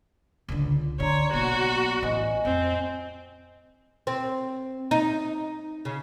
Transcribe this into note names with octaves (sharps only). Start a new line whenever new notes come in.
C#2 D3
D3 C#5 D5 A#5 C6
B1 A#3 F#4
A1 C5 D#5 G#5
F2 C4
C4
D#4
C#3